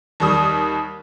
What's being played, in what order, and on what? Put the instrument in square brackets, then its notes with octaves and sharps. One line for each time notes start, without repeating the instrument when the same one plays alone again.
[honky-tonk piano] D#2 G3 D#6